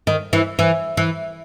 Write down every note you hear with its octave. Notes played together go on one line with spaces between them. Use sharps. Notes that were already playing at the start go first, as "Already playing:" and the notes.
D#3
E3
E3
E3